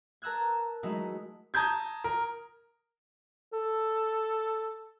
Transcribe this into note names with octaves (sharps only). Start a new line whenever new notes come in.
A#4 A5 A#5 E6 F#6 G#6
F#3 G#3 A3 D#4 E4
A5 A#5 D#6 G6 G#6
A#4
A4